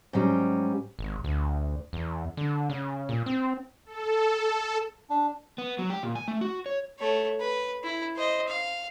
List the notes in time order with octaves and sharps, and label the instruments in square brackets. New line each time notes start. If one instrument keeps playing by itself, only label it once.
[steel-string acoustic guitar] G#2 F#3 G3 C#4
[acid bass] G#1
D2
E2
D3
C#3
A#2
C4
[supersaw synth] A4
[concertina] D4
[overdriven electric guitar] B3
F#3
G4
A#2
G#5
A3
F#4
C#5
[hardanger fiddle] A3 C#5
B4
E4
C5 D#5
F5